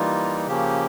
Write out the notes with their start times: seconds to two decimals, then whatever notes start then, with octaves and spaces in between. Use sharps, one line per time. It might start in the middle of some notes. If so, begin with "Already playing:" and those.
Already playing: E3 G3 A#3 D#4 F4
0.48 C#3 F3 A#3 C#4 G4